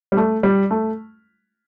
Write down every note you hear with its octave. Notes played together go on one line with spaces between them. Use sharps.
G3
A3
G3
A3